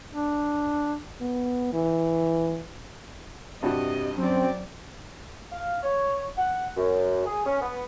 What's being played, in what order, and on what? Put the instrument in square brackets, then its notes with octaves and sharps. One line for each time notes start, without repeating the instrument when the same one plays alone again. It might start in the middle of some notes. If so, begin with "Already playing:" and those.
[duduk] D4
[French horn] B3
E3
[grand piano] G2 G3 F#4 [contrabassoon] C3 [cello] D#5
[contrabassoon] F#2 [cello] F#3 D5 [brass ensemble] C4
[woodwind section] F5
C#5
F#5
F#2
G#4
C#4
B3